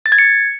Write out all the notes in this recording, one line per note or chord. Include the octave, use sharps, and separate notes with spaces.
A6
G#6
C#7